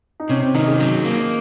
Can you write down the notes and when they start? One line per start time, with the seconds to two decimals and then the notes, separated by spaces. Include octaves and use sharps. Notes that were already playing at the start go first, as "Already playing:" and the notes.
0.20 D#4
0.29 C3 C#4
0.42 C4
0.55 D#3 D#4
0.67 G#4
0.80 F#3
1.05 A#3